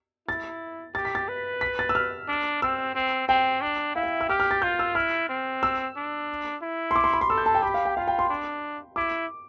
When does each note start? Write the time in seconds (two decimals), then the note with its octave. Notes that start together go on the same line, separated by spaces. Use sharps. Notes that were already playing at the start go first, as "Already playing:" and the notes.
0.28 E4 A6
0.95 G4 A6
1.05 B6
1.15 A6
1.28 B4
1.61 B6
1.79 A6
1.89 E6
1.95 F6
2.28 D4
2.62 C4 E6
2.95 C4
3.28 C4 G5
3.62 D4
3.95 E4 F5
4.03 E5
4.21 E6
4.29 G4 F6
4.40 F6
4.51 A6
4.62 F4 G6
4.79 E6
4.95 E4 F6
5.29 C4
5.63 E6
5.96 D4
6.62 E4
6.91 C6
6.96 D6
7.04 C6
7.13 B5
7.21 C6
7.30 A4 E6
7.38 G6
7.46 A5
7.55 G5
7.62 G4 B5
7.74 F5
7.85 G5
7.97 F4 F5
8.08 G5
8.19 C6
8.30 D4
8.96 E4 D6